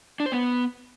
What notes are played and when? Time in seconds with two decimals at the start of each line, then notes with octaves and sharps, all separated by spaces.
0.20 D4
0.26 C5
0.32 B3